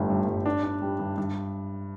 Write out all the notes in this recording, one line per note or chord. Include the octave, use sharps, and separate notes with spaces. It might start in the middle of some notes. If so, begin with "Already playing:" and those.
Already playing: G1 A2 G3
G2
G2
D4
D4
G3
G2
G2